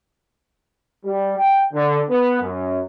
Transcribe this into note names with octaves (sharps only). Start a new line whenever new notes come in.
G3
G5
D3
B3
F#2